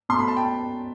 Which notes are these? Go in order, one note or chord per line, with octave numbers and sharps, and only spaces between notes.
B2 A3 C6
B5
A5
G5